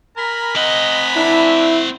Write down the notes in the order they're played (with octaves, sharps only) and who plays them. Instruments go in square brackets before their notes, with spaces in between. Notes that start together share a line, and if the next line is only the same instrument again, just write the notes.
[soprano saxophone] A#4 [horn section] G#5 A#5 B5
[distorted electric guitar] C4 F#5 [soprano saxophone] D#5
[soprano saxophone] D4 [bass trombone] E4